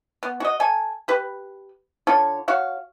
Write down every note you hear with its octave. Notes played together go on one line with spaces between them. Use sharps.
B3
F#4 D#5
A4 G#5
G4 B4
D3 F4 A4 C#5
F#4 C#5 F5